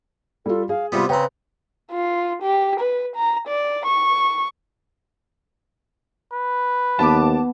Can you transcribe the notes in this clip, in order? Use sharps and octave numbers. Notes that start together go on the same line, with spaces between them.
G3 F4 A4
G#4 F5
C3 G3 B3 F4
C#3 C4 B4 G5 A#5
F4
G4
B4
A#5
D5
C#6
B4
D#2 B3 A5 D6